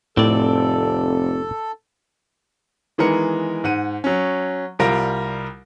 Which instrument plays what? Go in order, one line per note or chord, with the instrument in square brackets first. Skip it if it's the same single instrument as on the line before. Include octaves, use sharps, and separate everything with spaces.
[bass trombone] F1 [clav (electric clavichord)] A2 [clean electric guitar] C4 D5 [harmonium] A4
[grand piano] D#3 E3 G#3 B3 A#4 C#7
G#2 F#5 D#7
F#3 C#4
C2 G3 F4 A#4 A#6 D7